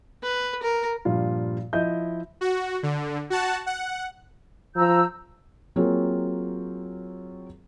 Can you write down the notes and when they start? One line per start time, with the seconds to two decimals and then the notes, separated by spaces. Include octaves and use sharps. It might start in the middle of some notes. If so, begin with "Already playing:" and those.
0.23 B4
0.63 A#4
1.05 G2 A#2 F3 G3 F4
1.73 F3 E4 D#5 G6
2.41 F#4
2.83 D3
3.30 F#4 F#5 A5
3.66 F#5
4.76 F3 A#5 E6 G6
5.76 F#3 A#3 C4 F4 G#4 C#5